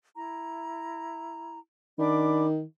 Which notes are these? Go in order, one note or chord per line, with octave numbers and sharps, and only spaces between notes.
E4 A#5
D#3 D4 B5 D6